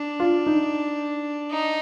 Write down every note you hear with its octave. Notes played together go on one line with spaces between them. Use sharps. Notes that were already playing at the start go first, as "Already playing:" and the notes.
Already playing: D4
F4
D#4
D#4